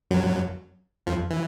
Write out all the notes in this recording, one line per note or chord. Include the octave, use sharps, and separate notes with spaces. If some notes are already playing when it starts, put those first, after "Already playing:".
F#2 F#3
F2 F3
E3